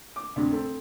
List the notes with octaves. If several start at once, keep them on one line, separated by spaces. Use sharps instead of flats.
D6
D2 G2 C3
A3 C4